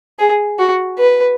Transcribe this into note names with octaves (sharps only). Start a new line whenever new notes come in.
G#4
F#4
B4